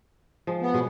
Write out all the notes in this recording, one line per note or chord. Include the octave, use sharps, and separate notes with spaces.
F3 G#3
B3
B2 G#3 C#5